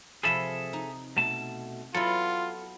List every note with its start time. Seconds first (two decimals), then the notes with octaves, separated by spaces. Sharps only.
0.23 C3 F3 G#4 A4 E5 B5
0.73 D#4
1.17 B2 A3 A5
1.95 F#3 B3 E4 F4 A4